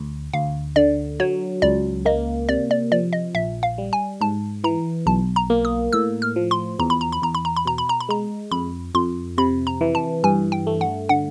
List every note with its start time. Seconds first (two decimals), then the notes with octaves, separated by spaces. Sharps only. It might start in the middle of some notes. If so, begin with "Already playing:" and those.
Already playing: D2
0.34 D2 F5
0.76 D3 D5
1.20 F#3 C#5
1.62 C#2 D5
2.05 A#3 D#5
2.49 C3 D5
2.71 D5
2.91 F3 D5
3.13 D#5
3.35 A#1 E5
3.63 F5
3.78 G3
3.93 G#5
4.21 G#2 A5
4.64 E3 A#5
5.06 B1 A5
5.36 A#5
5.50 A#3
5.65 D#6
5.93 A2 E6
6.22 F6
6.36 F3
6.51 C6
6.79 E2 A#5
6.90 B5
7.01 A#5
7.12 B5
7.22 E2 A#5
7.35 B5
7.45 A#5
7.56 B5
7.65 B2 A#5
7.78 B5
7.89 A#5
8.00 B5
8.09 G#3 A#5
8.52 F2 B5
8.95 F2 C6
9.38 C3 B5
9.67 A#5
9.81 E3
9.95 A5
10.24 G2 G#5
10.52 G5
10.67 A3
10.81 F#5
11.09 D3 F#5